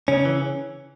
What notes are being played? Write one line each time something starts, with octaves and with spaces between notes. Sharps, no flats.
C#3 C#4
E3